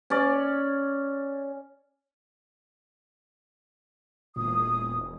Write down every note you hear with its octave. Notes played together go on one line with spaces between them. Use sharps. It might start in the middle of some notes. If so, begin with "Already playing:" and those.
C#4 D5
E1 A#2 D#6